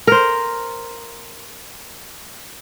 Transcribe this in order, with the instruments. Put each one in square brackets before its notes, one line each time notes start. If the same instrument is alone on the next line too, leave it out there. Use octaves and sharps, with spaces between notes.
[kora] A#4 C5